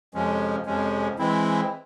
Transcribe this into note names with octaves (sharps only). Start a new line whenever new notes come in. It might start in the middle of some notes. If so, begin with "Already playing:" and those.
F2 C3 F3 G#3 C#4
F2 C3 F3 G#3 C#4
E3 G#3 C4 E4